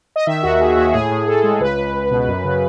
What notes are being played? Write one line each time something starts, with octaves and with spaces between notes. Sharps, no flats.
D#5
D#3 E5
D#2 F#4
D#2 G#4
D#2 F#4
A2 G#4
A2
A2 A4
G#3
C#2 B4
C#2
C#2
B2
F#2
C#3